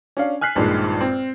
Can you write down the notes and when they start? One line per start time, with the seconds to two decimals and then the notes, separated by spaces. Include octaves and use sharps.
0.17 C#4 D4 F5
0.41 G#5 F6 F#6 B6 C7
0.55 A#1 G2 A#2 D#3 G#3
1.01 C4